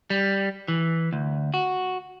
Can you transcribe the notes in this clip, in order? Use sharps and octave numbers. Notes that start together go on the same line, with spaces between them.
G3
E3
D2
F#4